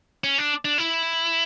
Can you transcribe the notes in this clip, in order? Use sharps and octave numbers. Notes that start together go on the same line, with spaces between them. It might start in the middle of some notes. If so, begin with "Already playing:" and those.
C#4
D4
D4
E4